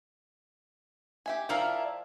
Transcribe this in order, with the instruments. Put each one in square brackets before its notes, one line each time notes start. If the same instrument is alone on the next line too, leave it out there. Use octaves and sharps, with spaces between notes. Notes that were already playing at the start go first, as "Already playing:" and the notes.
[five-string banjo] G4 E5 G#5
[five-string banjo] F3 F4 G5 [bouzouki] D4 E4 A#4